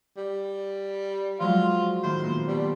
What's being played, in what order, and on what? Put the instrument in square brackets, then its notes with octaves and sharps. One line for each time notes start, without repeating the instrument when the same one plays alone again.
[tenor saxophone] G3
[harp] F3 F#3 G#3 [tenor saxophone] F4
[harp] A2 D#3 [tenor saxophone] C5
[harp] A#2 B3
[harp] B2 [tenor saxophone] G3